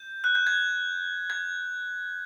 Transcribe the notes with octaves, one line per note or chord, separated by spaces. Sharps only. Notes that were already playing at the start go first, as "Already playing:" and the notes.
Already playing: G6
F#6
G6
G#6
G#6